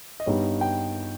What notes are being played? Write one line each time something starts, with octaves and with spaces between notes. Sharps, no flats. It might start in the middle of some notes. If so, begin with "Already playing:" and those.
D#5
G2 G3 B3 D#4 C#5
G5